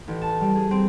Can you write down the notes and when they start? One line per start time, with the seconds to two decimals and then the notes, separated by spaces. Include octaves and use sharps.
0.08 A1
0.22 A5
0.41 G3
0.56 G#4
0.71 C4